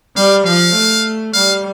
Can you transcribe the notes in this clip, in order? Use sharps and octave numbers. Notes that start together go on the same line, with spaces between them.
G3 F5
F3 F5
A3
G3 F5